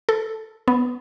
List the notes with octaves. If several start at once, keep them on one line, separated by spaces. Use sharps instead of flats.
A4
B3